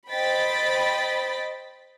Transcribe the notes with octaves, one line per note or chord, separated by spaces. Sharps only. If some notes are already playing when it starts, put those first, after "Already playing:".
C5 D#5 G5 B5 A6 B6